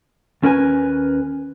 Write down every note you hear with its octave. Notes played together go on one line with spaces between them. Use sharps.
D#2 C#4 A#4 B4 G#5